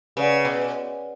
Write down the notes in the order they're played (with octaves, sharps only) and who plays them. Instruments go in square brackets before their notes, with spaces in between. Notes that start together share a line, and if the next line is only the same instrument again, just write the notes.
[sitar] C#3 [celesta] B4 D5 F#5
[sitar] B2